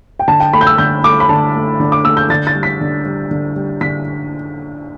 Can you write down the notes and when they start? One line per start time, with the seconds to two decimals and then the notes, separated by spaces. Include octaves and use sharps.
0.19 G5
0.28 D3 A5
0.40 G5
0.53 A3 B5
0.61 G6
0.67 E6
0.78 D3 G6
1.04 A3 D6
1.20 B5
1.29 D3 A5
1.55 A3
1.80 D3
1.92 D6
2.05 A3 E6
2.17 G6
2.30 D3 A6
2.47 A6
2.55 G3
2.63 B6
2.81 D3
3.05 G3
3.31 D3
3.56 G3
3.81 D3 B6